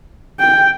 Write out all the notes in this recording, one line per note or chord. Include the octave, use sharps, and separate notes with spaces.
G5